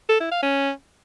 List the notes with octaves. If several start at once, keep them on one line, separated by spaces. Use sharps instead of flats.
A4
E4
F5
C#4